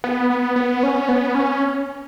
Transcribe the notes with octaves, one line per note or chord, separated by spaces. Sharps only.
B3
B3
B3
C#4
B3
C#4